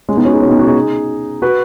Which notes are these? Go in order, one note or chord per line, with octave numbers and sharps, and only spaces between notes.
G#3 C#4
B3 D#4
C#4 F#4
D#4 G#4
C#4 F#4
B3 D#4
C#4 F#4
D#4 G#4
F#4 B4